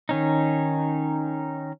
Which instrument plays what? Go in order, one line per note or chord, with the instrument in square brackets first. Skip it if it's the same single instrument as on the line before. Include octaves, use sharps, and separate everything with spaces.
[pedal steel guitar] D#3 C#4 D#4